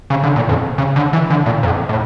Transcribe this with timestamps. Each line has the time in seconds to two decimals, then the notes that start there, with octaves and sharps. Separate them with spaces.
0.10 C#3
0.23 D3
0.36 A#2
0.49 F2
0.78 C#3
0.96 D3
1.13 E3
1.30 D3
1.46 A#2
1.63 F2
1.89 A2